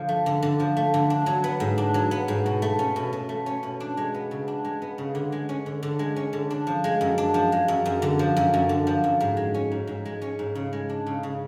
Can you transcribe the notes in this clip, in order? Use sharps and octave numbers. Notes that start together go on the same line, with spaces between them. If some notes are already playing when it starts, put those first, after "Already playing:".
Already playing: D3 F3
A3
D3
D3
F3
A3
D3
D4
F#3
B3
G#2
D4
F#3
B3
G#2
B2
A3
C#4
B2
B2
A3
C#4
B2
D4
G#3
B3
C#3
D4
G#3
B3
C#3
D3
G#3
C#4
D3
D3
G#3
C#4
D3
D4
F3
G#3
F#2
D4
F3
G#3
F#2
F#2
D3
F3
F#2
F#2
D3
F3
F#2
G#2
G#3
C#4
G#2
G#2
G#3
C#4
G#2
C#3
G#3
D4
C#3
C#3